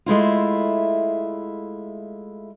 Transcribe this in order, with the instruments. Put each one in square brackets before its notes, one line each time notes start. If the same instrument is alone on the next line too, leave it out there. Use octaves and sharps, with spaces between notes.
[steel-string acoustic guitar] G#3 A3 E4 F4